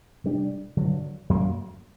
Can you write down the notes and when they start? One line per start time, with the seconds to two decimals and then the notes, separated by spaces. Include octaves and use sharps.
0.24 C3 G3 D4
0.77 G2 D3 F#3
1.30 F#2 F#3 A#3